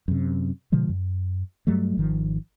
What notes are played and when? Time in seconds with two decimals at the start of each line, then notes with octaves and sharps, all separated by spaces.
0.08 F#2 C3
0.72 B2 D3 F3 G#3
0.89 F#2
1.67 G2 F#3 G3 A3
1.97 G#1 D#3 F3